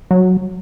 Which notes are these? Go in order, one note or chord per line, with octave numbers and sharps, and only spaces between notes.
F#3